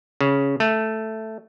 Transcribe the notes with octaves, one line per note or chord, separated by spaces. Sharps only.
C#3
A3